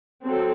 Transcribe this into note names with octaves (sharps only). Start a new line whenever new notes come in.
F#3 C4 A4